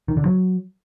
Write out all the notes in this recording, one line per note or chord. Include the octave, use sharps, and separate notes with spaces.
D#3
D3
F#3